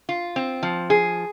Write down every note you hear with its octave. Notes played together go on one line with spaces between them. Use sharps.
F4
C4
F3
G#4